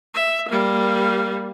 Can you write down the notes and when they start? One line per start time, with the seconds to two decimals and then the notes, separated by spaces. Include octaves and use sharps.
0.15 E5
0.49 G3 A#3